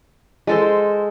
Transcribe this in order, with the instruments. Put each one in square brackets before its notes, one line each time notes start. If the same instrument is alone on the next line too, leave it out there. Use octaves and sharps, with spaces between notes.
[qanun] G#3 A4 C5